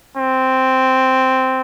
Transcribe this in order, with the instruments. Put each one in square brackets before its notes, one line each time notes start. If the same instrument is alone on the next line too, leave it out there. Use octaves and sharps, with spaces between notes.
[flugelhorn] C4